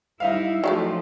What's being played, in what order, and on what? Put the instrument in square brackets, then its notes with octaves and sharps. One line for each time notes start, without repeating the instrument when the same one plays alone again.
[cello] G3 E4 [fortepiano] D#4 E5 F5
[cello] F3 [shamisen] F#3 G#3 A3